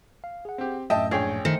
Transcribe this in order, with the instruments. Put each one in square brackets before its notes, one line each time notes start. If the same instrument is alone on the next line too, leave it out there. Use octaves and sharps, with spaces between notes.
[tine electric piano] F5
G#4 F#5
[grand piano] C4 G4
[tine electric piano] F#2 A2 A3 [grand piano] D#5 G5 A5 [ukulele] E5
[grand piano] A#1 C#5 G5 [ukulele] G#4
[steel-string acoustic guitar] D#3 [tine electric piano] A3 C5 C#7